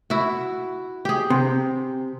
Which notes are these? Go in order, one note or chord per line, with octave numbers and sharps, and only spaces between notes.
E4 F#4
G4 G#4
C3